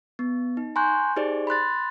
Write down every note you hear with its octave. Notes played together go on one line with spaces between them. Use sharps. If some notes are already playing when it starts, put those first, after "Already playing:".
B3
D#4
G#5 A#5 C6 C#6 F#6 G6
D#4 G4 G#4 C5 D5
B5 C6 F#6 A6